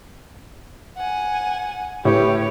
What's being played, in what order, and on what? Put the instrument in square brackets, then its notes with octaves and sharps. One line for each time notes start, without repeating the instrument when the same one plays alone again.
[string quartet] F#5 G#5
[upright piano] A2 [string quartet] G4 B4 C#5